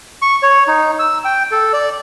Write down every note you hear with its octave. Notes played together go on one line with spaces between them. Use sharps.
C#6
C#5
D#4
E6
G5
A4
D5